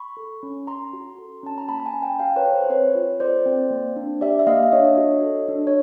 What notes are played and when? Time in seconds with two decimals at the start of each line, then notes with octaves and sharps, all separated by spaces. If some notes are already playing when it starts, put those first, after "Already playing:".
Already playing: B5 C#6
0.17 A4
0.43 C#4
0.67 C#4 A#5 C6
0.93 F#4
1.18 A4
1.43 C#4 A5
1.58 A#5
1.69 A#3 A5 B5
1.80 A5
1.85 G#5 A#5
1.93 C#4
2.02 G5 A5
2.19 F#4 F5 G5
2.36 B4 C#5
2.44 A4
2.53 C5
2.64 C5
2.70 C4 B4 C#5
2.95 F4
3.20 A4 C5 D5
3.46 C4
3.71 A#3
3.96 D4
4.21 G4 D5 E5
4.39 E5
4.47 A#3 D#5 F5
4.63 E5
4.72 D4 C#5 D#5
4.97 F#4
5.23 A4
5.48 D4
5.67 C#5